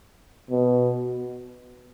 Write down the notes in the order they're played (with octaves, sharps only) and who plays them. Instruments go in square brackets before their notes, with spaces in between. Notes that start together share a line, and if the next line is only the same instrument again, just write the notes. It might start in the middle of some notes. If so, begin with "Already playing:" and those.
[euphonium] B2